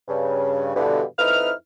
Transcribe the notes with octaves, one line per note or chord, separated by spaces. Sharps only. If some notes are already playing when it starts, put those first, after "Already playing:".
G2 C#3
G2 B2 D3 E3
F2 D#4 E4 B4 F6